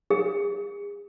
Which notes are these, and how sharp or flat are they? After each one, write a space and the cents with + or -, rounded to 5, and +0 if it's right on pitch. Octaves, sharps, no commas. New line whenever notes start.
G#4 -40